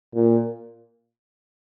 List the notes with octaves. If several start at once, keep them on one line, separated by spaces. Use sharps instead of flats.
A#2